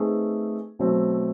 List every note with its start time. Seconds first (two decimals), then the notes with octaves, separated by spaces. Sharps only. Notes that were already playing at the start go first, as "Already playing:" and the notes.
Already playing: A3 C4 D#4 G#4 B4
0.79 B2 F#3 A3 C4